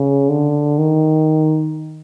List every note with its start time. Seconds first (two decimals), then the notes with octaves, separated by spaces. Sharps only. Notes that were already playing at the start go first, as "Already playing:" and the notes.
Already playing: C#3
0.29 D3
0.79 D#3